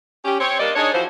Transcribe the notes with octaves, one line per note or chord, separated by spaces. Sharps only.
C#4 G4
C4 C#5
G3 A#3 D4 D5 D#5
D4 D#4 G#4 C#5
E3 F3 F#4 C5